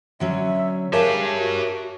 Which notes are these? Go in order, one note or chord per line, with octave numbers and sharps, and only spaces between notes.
D3 F#3 C#4 E5
G4 G#4 A#4 C#5 E5 F5 A5
F#4